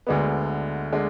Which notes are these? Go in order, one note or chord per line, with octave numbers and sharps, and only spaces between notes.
D2 D3 G#3 B3
D3 G#3